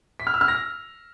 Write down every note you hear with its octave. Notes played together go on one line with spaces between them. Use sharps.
B6
F6
E6
F6
A#6